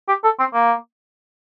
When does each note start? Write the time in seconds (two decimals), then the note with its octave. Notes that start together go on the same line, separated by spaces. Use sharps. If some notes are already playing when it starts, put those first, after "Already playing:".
0.08 G4
0.24 A4
0.39 C4
0.54 A#3